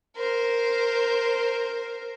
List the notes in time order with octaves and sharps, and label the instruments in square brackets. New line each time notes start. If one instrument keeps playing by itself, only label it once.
[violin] A#4 C5